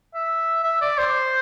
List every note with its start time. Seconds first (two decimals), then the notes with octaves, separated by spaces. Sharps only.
0.14 E5
0.64 E5
0.81 D5
0.98 C5